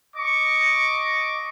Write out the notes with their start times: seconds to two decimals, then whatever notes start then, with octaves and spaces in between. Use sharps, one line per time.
0.16 D#5 C#6 D6